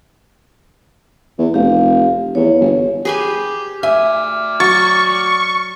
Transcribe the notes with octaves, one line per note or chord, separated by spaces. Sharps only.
E2
F1 G4 F5
E2 C#5
G1
G4 G#4 B4 G#5
D5 E5 G#5 F6
F#3 C#6 A6